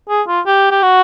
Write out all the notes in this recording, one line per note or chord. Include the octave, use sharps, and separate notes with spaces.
G#4
F4
G4
G4
F#4